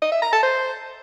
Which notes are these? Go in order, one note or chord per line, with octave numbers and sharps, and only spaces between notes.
D#5
E5
A#5
A5
C5